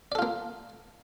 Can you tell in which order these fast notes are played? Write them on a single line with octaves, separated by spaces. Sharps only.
D5 A4 F4 A#3